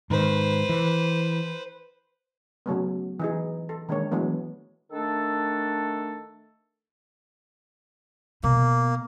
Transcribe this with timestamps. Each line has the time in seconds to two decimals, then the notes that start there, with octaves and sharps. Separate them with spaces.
0.10 G#2 D#3 B4 C5
0.69 E3
2.66 C#3 F#3 A3 B3
3.20 E3 D#4 G#4
3.69 A4
3.89 D#3 G#3 A#3 D4 C#5
4.11 E3 F#3 G#3 A3 B3 D4
4.91 D#3 A3 D4 A4
8.44 B2 A#3